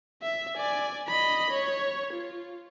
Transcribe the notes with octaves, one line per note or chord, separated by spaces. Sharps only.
E5
D5 G#5
D#5 B5
C#5
F4